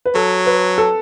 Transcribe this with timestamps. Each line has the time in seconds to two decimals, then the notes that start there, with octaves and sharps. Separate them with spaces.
0.05 B4
0.15 F#3 A4
0.46 B4
0.78 A4